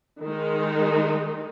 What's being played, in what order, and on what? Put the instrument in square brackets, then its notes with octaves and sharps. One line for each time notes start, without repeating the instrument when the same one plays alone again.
[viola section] D#3 G#3 D#4